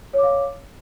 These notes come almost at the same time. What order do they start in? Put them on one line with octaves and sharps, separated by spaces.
C#5 D6 F5